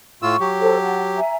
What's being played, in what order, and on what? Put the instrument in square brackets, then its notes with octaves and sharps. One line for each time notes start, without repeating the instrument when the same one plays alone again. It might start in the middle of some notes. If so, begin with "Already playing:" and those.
[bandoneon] A2 F4 E6 [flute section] C#6
[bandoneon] F#3 G4
[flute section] A4 C5
F#5 A5
E5 G#5 A#5